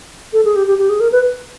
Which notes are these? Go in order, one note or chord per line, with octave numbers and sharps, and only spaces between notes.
A4
G#4
G4
G4
G4
G#4
A#4
B4